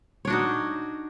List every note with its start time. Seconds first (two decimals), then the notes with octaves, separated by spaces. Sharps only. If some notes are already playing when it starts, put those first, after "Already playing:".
0.25 C#5
0.27 D4
0.30 F#4
0.33 D#4